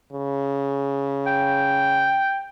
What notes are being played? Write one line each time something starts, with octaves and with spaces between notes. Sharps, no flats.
C#3
G5